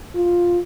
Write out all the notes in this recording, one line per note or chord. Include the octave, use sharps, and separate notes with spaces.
F4